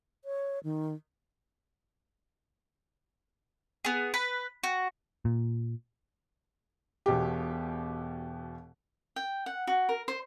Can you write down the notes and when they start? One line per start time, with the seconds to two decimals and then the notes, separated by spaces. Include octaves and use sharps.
0.25 C#5
0.64 D#3
3.85 B3 G#4
4.14 B4
4.63 F#4
5.25 A#2
7.06 E1 B2 G4
9.16 G5
9.46 F#5
9.67 F#4
9.89 A#4
10.08 C5